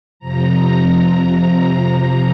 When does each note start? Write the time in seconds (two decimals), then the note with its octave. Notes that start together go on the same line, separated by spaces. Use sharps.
0.19 F2 C3 F3 A#5
1.50 F2 C3 F3